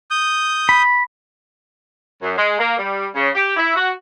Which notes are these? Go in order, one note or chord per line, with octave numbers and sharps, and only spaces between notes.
D#6 G6
B5
F#2
G#3
A#3
G3
C#3
G4
E4
F#4